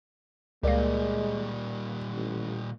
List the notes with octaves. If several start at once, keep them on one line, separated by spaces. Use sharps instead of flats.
C#2 A#2 G3 G#3 A#3 A#4 D5
A1